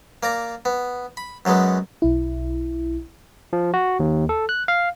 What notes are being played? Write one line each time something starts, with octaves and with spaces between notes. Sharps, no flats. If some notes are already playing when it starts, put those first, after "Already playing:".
A#3 D5 A#5
B3
B5
F#2 F#3 G#3 B3
B1 E4
F3
F#4
D#2
A4
F#6
F5